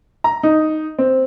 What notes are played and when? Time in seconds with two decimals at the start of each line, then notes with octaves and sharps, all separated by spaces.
0.24 A#5
0.43 D#4
0.99 C4